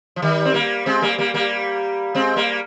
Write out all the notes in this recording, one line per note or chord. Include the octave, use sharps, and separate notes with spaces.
F3
D#3 G3
C4
G3 A#3
G#3 C4
G3 A#3
G3 A#3
G3 A#3
G#3 C4
G3 A#3